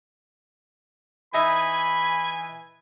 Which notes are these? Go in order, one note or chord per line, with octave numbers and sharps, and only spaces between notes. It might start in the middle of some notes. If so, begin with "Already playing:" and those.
E3 D#4 E4 G#5 B5